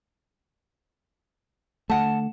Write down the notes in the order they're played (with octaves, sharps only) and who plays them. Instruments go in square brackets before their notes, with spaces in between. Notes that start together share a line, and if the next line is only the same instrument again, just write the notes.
[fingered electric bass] D3 A3 [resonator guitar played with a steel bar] F#5 A5